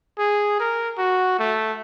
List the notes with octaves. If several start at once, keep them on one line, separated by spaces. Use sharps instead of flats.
G#4
A#4
F#4
A3